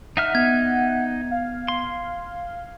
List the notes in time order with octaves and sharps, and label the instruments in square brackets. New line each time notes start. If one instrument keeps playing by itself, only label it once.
[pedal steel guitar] D#4 E5 F6 [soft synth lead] F#5
[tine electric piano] B3 [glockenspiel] G#6
[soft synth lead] F5
[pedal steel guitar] C6